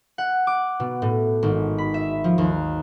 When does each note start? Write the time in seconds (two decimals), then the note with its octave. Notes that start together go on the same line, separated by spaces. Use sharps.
0.18 F#5
0.47 D6
0.80 B2
1.02 A2
1.43 G#1
1.78 B5
1.94 E5
2.24 F3
2.38 D#2